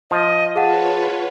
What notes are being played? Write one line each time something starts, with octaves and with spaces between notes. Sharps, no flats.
F3 D#5
F4 G#4 B4 C#5 F5 F#5 A5